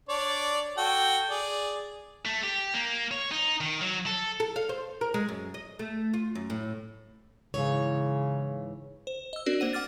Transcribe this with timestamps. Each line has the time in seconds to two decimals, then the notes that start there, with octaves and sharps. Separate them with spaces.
0.09 D4 C#5 D5
0.77 F#4 A4 G5
1.30 G#4 D5
2.26 A3
2.43 G4
2.74 A#3
3.11 C#5
3.31 D#4
3.61 D#3
3.81 F#3
4.06 A4
4.40 A4
4.56 F5
4.69 C5
5.01 A#4
5.14 G#3
5.29 F#2
5.54 D#5
5.79 A3
6.13 F4
6.35 F#2
6.50 A2
7.54 G#2 C#3 E3 C#5
9.07 C5
9.33 D#5 E6
9.46 C4 D4 F#4 A#4 D5
9.60 A#3 C5 F#5 D#7
9.73 F#5 D6 F6 A6